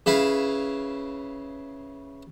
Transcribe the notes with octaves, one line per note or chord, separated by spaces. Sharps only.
C#3 E4 B4 F5